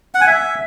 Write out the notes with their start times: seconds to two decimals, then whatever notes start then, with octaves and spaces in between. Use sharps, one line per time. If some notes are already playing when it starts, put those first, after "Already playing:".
0.15 F#5
0.21 G#5
0.27 E5